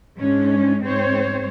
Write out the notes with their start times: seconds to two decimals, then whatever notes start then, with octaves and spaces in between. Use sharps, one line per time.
0.18 G#2 G#3 C#4 D4
0.83 G#2 C4 C5 C#5